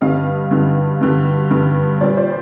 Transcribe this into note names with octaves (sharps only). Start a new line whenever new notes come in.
G2 D3 G3 D#5 F5
G2 D3 G3
G2 D3 G3
G2 D3 G3
A#2 G3 C5 D5
C5 D5